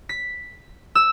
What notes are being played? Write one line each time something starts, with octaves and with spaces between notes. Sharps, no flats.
B6
E6